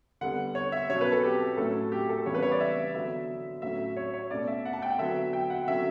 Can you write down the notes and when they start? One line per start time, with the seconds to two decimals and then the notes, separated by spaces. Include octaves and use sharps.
0.21 D3 G3 B3 F#5
0.55 C#5
0.72 E5
0.89 B2 F#3 C#4 C#5
1.01 B4
1.12 A4
1.23 G4
1.57 A2 F#3 A3 C#4 A4
1.92 G4
2.09 A4
2.26 C#3 E3 G3 B3 C#5
2.34 B4
2.43 C#5
2.52 D5
2.60 E5
2.94 D3 F#3 B3 E5
3.62 A2 F#3 A3 C#4 E5
3.97 C#5
4.14 C#5
4.31 B2 A3 C#4 D5
4.48 E5
4.65 F#5
4.73 A5
4.82 G5
4.90 F#5
4.98 D3 F#3 B3 E5
5.33 G5
5.50 F#5
5.67 D3 F#3 C#4 E5